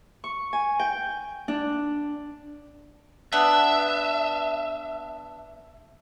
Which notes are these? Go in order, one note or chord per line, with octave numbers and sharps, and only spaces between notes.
C#6
G#5
G5
D4
B3 D4 E5